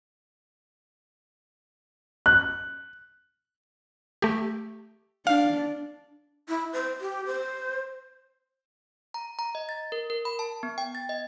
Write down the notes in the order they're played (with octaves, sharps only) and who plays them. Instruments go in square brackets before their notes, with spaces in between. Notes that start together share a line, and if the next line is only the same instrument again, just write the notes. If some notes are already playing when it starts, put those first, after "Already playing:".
[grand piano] F#6
[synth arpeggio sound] A3 G4
[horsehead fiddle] D4 [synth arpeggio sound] F5
[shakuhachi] E4
C5
G4
C5
[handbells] A#5
A#5
D#5
A6
A#4
A#4
B5
A5
B3
G5
A6
D#5